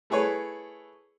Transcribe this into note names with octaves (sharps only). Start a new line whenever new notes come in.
A3 E4 G#4 B4 C#5